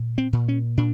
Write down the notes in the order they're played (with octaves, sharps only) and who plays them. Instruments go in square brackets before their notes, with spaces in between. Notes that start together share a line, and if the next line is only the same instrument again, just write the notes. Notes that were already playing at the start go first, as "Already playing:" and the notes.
Already playing: [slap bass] A#2
C4
A#2
C#4
A#2 D4